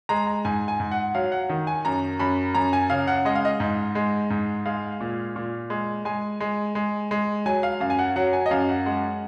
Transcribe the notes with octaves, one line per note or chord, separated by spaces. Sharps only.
G#3 A#5
A#5
G#2 G#5
G#5
G#2
F#5
F#3 F5
F#5
D#3
G#5
F#2 A#5
F#2 B5
F#2 A#5
G#5
C#3 F5
F#5
G#3 D#5
F5
D#5
G#2
G#3
G#2
G#3 F5
A#2
A#2
G#3
G#3 G#5
G#3
G#3
G#3
F#3 G#5
F5
F#2 F5
G#5
F#5
F#3 F#5
G#5
D#5
F#2 F5
F#5
G#3 F#5